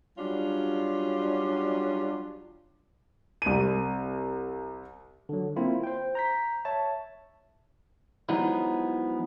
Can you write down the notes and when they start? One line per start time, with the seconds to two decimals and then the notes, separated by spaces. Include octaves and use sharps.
0.18 F#3 G3 C#4 D4 F4
3.42 C2 D#7
5.29 D3 F#3
5.56 A#3 C4 E4 F4
5.84 C5 G5
6.15 A#5 G6 B6
6.65 C#5 E5 A5
8.29 F3 F#3 G#3 B3 D#4 E4